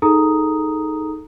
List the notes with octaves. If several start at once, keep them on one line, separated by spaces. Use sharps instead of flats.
D#4 G#4 A4 A#5 D#6